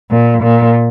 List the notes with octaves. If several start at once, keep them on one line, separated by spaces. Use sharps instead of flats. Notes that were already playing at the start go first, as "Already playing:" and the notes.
A#2
A#2